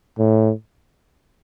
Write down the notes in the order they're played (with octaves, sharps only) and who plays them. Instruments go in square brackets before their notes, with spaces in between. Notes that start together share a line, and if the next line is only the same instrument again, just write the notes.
[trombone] A2